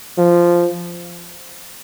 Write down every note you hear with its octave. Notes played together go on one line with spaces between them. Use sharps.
F3